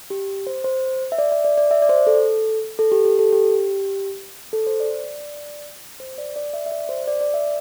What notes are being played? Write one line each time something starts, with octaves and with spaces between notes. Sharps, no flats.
G4
C5
C5
E5
D5
E5
D5
D5
E5
D5
C5
A4
A4
G4
G4
A4
G4
A4
C5
D5
C5
D5
D5
E5
E5
D5
C5
D5
D5
E5